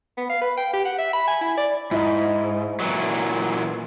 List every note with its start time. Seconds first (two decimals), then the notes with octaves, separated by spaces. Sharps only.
0.18 B3
0.30 F5
0.42 B4
0.57 G5
0.73 G4
0.85 F#5
0.99 E5
1.14 B5
1.28 G#5
1.41 E4
1.58 D5
1.91 G#2 E4 D#5
2.80 A#2 E3 F#3